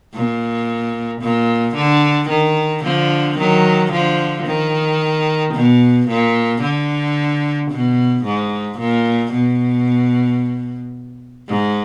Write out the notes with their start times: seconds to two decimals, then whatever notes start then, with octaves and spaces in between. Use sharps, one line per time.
0.14 A#2
1.21 A#2
1.75 D3
2.29 D#3
2.83 D3 F3
3.38 D#3 F#3
3.91 D3 F3
4.46 D#3
5.54 B2
6.08 A#2
6.62 D3
7.71 B2
8.24 G#2
8.78 A#2
9.32 B2
11.49 G#2